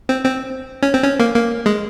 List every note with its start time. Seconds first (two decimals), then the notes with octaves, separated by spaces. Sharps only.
0.09 C4
0.25 C4
0.83 C#4
0.94 C4
1.04 C#4
1.20 A#3
1.35 A#3
1.66 G#3